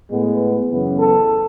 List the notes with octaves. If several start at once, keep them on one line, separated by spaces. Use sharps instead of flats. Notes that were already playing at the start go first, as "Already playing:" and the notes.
A2 G#3 B3
F#2 C#3 E3 B3
A4